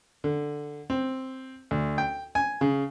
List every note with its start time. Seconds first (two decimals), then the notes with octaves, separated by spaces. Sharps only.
0.24 D3
0.90 C4
1.71 D2
1.98 G5
2.35 G#5
2.61 C#3